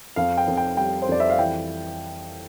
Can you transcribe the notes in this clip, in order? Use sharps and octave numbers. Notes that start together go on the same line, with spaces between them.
F2 F5
G5
F2
G5
G3 G5
C5
F2 D5
E5
F5
E3 G5